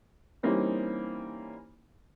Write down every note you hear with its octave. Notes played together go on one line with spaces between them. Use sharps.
E3 G3 A#3 C4 C#4 D#4